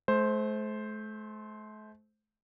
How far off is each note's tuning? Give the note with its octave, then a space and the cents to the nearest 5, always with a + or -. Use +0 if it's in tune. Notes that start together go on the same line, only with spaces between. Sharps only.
A3 -40 C5 +0